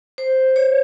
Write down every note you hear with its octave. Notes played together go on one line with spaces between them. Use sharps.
C5
C#5